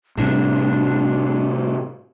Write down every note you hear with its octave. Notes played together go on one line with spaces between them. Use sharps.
A2 C3 G3 D4